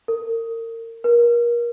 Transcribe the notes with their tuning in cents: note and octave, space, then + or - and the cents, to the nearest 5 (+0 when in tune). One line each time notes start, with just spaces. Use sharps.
A#4 -35
A#4 +30